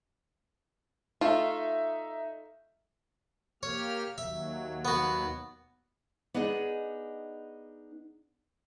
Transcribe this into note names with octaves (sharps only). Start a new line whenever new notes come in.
A3 D#4 F4 E5
A#3 G4 C#5 F6
D#2 F#3 E5
B3 F#4
B3 D4 D#4 G#4 D#5